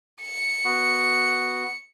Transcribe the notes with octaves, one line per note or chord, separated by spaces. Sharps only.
C#7
B3 F#4